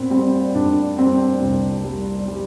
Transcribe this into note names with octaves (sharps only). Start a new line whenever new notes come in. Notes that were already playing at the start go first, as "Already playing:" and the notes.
Already playing: A#2 B3 C4
G3 C4
A#2 D4
G3 C4
C2
G3
G3